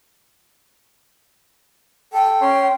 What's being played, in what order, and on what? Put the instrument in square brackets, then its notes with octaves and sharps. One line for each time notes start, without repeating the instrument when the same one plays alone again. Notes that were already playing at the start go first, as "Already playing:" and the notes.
[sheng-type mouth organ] A4 [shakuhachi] G5
[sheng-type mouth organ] C#4 C#5 C6